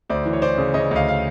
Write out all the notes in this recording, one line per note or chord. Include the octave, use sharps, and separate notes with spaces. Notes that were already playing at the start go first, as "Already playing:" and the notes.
D2 C5 D5
E3
C#5
E3 C5 D5
C#3
C#3 C#5 D#5
D2 D#5 F5
F5